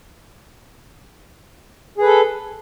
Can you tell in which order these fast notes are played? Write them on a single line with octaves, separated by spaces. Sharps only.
G#4 B4 A4